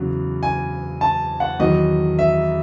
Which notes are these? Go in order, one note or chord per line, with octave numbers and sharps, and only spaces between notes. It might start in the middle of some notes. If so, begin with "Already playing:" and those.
Already playing: E2 C#3 F#3
G#5
A5
F#5
E2 D#3 F#3 D#5
E5